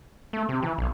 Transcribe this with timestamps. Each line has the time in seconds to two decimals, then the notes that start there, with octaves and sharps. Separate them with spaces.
0.33 A3
0.49 C3
0.63 E3
0.78 B1